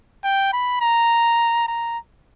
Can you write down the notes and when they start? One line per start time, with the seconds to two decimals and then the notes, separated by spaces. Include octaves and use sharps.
0.24 G5
0.53 B5
0.81 A#5
1.68 A#5